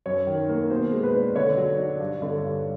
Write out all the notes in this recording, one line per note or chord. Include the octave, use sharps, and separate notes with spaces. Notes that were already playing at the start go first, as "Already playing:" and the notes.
F#2 C#5
D#3
A#3
B2 C5
G#3
B4
D4
D3 C#5
F#3
D4
G2
D3
G2